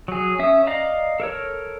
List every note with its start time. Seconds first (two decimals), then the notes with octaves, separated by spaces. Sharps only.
0.08 F#3 G#4
0.39 C#4 E5 D#6
0.67 D5 D#5 F5 A#5
1.20 A4 A#4 C#5